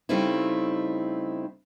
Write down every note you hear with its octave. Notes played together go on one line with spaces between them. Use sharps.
C#3 G3 A3 C4 D#4 E4